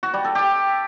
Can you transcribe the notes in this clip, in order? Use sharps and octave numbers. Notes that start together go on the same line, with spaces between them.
F#4
G3
A4
G4